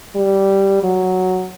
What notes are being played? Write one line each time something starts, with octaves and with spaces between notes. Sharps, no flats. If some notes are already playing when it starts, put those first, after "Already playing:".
G3
F#3